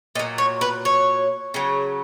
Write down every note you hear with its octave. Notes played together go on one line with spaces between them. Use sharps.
A#2 F#3 D#5
C#5
B4
C#5
C#3 F#3